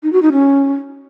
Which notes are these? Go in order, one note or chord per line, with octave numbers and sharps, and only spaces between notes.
D#4
F#4
D#4
C#4